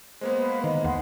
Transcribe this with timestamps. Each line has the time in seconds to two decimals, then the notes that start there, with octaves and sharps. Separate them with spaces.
0.21 G#3 A#3 B3 C5
0.38 B4 F5
0.64 D#3 D#5
0.84 D#2 G#4 F5 F#5 C6